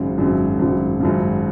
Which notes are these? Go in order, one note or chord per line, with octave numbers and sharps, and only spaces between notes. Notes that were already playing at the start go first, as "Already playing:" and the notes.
Already playing: G#1 F#2 C#3
G#1 F#2 C#3
G#1 F#2 C#3
G#1 F#2 C#3